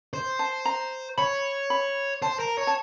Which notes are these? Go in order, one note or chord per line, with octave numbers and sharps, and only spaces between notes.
C5
A5
A#5
C#5 B5
B5
C5 A5
A#4
C#5
A5